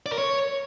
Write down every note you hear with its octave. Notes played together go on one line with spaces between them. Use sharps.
D5
A#4
C#5